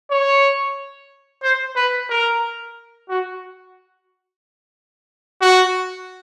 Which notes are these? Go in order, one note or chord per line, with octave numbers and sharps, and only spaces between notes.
C#5
C5
B4
A#4
F#4
F#4